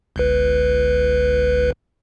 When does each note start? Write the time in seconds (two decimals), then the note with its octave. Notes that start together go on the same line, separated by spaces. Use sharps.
0.16 G1 C#2 B4